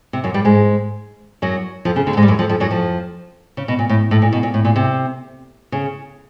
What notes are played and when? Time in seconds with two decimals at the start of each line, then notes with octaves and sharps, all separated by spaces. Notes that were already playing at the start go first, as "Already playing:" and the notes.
0.13 C3
0.24 F#2 F#3
0.34 G2 G3
0.45 G#2 G#3
1.42 F#2 F#3
1.85 F2 F3
1.96 C#3
2.07 D2 D3
2.17 G#2 G#3
2.23 G3
2.28 F#2 F#3
2.39 F2 F3
2.49 F2 F3
2.60 F#2 F#3
2.71 F2 F3
3.57 C#3
3.68 B2
3.79 A#2
3.89 A2
4.11 A2
4.22 A#2
4.32 B2
4.43 A#2
4.54 A2
4.65 A#2
4.76 C3
5.72 C#3